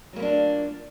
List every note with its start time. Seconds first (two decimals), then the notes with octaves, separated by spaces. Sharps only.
0.13 F#3
0.16 A#3
0.19 B3
0.22 D4
0.26 F4